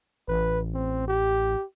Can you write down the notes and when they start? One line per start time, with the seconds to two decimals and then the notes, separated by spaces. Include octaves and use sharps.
0.28 A1 B4
0.74 C4
1.08 G4